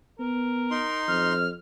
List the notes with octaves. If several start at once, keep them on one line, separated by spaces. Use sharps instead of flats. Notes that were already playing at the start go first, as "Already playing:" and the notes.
B3 A#4
D#4 C6
F2 F6